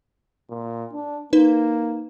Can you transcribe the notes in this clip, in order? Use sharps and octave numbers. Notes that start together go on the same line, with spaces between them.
A#2
D4
A#3 D#4 B4